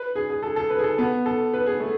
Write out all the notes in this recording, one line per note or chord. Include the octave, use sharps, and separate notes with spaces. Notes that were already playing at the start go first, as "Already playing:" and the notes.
Already playing: B4
G#4
G#4
A4
A4
B4
G#4
A4
B3
A4
B4
G#4
A3